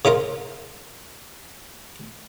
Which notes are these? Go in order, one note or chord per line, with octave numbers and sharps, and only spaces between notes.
C#3 D#4 F4 A#4